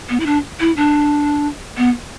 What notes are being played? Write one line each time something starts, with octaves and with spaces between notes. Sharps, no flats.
B3
E4
D4
E4
D4
B3